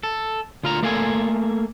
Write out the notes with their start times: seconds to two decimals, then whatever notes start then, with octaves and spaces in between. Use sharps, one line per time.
0.03 A4
0.63 D2 F4 A#5
0.82 A3 A#3 A4 F5 G5 G#5